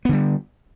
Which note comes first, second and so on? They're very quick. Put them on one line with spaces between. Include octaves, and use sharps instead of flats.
B3 D3 G3